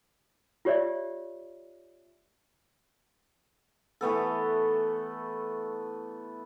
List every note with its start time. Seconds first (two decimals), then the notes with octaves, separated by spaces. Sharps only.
0.65 F4 G4 C#5 D5 E5
4.01 E3 A3 B3 A4